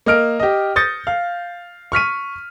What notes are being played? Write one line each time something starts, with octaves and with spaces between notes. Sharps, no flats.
A#3 D#5 F6 D7
G4 D#5
D#6 G6 A6 A#6 C#7
F5
C#6 F6 B6 D#7